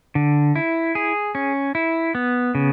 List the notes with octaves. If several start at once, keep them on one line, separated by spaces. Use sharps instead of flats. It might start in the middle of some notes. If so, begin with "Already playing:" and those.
D3
E4
G#4
C#4
E4
B3
C#3